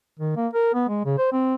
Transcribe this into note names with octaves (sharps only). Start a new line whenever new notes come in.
D#3
A#3
A#4
B3
G#3
C#3
C5
C4